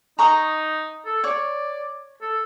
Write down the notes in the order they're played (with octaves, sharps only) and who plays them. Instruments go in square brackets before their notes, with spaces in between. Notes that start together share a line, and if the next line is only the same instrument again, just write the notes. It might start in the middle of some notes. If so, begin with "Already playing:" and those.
[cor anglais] D#4 [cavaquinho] A#5 C#6 D#6
[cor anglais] A4
[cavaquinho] C#5 [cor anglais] D5
[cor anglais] A4